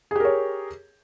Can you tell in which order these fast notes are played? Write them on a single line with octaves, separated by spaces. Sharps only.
G#4 G4 A#4 C#5